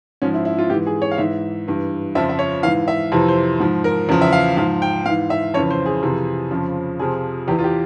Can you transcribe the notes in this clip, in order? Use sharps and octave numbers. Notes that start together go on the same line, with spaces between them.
G#2 F3 C#4
E4
E4
F4
G#2 E3 G4
G#4
C#5
F5
G#2 E3 E5
G2 E3
F2 C#3 F3 E5
E5
C#5
G#2 E3 F5
E5
F2 C3 E3
C5
G#2 F3
A#4
E2 C#3 F3
E5
F5
G#2 F3 F5
G5
G#2 E3 F5
E5
F2 C#3 E3 C#5
C5
G#4
F2 C3 E3
F2 C#3 F3
F2 C3 F3 G#4
E2 E3 G4
F4
G4